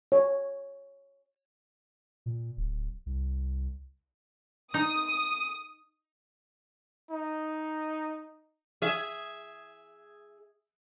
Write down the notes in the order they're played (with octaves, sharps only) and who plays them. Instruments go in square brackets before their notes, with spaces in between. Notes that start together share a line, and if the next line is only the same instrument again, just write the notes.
[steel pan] C#5
[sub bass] A#2
D1
C2
[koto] D#4 [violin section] D#6
[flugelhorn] D#4
[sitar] G#4 E5